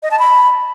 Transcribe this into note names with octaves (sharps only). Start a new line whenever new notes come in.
D#5
A5
B5